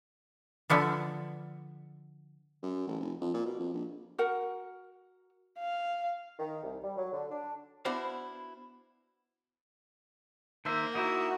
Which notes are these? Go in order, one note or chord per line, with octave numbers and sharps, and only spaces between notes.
D3 F3 B3 D4
F#2
A1
F1
F2
A#2
B2
F2
A#1
F#4 A#4 F#5
F5
D#3
C2
G3
F#3
D3
D4
B3 D4 E4 F#4 C5 F5
D#3 A#3 C5 E5
D#4 E4 F#4 E5